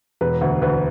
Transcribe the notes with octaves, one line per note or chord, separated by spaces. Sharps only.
E1 B4
D2
D2 B4